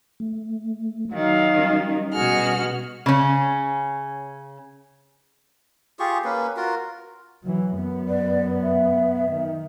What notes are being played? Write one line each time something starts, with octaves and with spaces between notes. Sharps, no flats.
A3
D#3 F#3 F5
G3 C#4
B2 F#4 G#4 F6
C#3 C#4
F4 G4 G#4 C#6
A#3 C#4 B4
F4 F#4 A#4
E3 F#3
F#2 B3
D5
E5
D#3